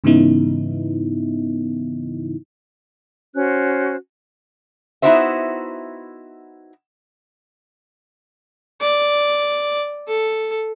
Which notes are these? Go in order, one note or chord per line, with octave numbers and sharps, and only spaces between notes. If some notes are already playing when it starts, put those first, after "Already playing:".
G#2 C#3 E3 B3 D#4 E4
C#4 F#4 C5 F#6
B3 D#4 E4 F#4 C5 E5
D5
A4